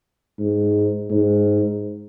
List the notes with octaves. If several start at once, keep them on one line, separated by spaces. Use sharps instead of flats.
G#2
G#2